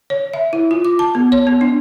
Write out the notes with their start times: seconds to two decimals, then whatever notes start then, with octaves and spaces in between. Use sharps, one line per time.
0.10 C#5
0.34 E5
0.53 E4
0.71 F4
0.85 D6
0.99 A5
1.15 B3
1.32 C#5
1.47 B3
1.61 D4